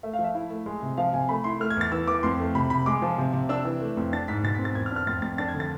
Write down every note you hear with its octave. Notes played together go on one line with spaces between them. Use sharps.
A3 E5
F5
F3
E5
E4
A3
G#3
C3
F3 F5
C3 G#5
A3 B5
E4 C6
A3 F6
G#6
E2 A6
E3 E6
E3 D6
F2 C6
A3
C3 B5
C3 B5
G#3 D6
F3
C3
C3
D4 E6
E3
A3
F2
D4 A6
G#2 B6
B2 A6
C4 B6
A6
E2 G#6
F6
D4
F6
F2 A6
F2 A6
D4 A6
G#6
D3
A6